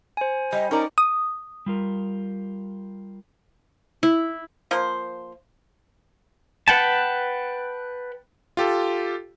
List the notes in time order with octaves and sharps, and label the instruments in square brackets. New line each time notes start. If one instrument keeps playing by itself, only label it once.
[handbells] C5 G#5
[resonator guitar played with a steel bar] G3 [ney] D#5
[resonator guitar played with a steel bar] C#4 A#4 D5 [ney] D#4
[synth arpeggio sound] D#6
[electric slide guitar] G3 F4 A#4
[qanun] E4
[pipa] F3 A#3 C5
[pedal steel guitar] B4 F#5 G5 A5
[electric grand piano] F4 G4 A4